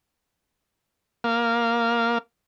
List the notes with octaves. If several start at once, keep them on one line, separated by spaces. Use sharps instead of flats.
A#3 F5